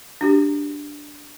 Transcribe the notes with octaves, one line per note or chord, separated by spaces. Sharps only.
D4 F#4 G4